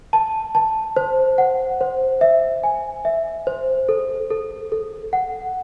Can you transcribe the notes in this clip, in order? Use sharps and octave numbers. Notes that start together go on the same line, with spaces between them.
A5
A5
C5
F#5
C5
E5
G#5
E5
C5
A4
A4
A4
F#5